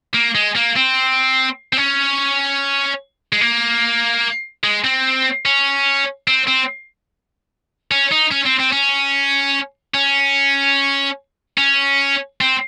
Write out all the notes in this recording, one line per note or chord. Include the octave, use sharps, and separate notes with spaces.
A#3
G#3
A#3
C4
C4
C#4
G#3
A#3
G#3
C4
C#4
C4
C4
C#4
D#4
C#4
C4
C4
C#4
C#4
C#4
C4